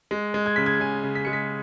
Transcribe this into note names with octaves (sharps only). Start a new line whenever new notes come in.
G#3
G#3
G#6
C#3 B6
G#6
C#3 G#5
C#3
B6
G#3 C#7
B6